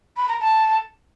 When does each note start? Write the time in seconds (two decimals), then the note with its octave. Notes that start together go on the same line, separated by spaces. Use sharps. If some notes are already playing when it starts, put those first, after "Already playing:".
0.17 B5
0.29 A#5
0.40 A5